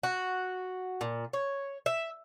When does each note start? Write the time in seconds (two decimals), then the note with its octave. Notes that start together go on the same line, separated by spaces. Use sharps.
0.03 F#4
1.01 A#2
1.33 C#5
1.86 E5